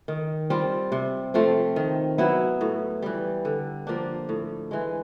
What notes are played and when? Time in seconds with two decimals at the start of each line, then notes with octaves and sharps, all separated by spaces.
0.08 D#3
0.50 G3 C4 F4
0.92 C3
1.34 F3 A3 C4
1.76 D#3
2.18 F#3 B3 E4
2.61 A2
3.02 E3 G3
3.45 D3
3.87 F3 A#3 D4
4.29 A2
4.71 E3 G#3